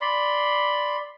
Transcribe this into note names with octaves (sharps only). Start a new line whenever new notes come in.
D5 B5 C6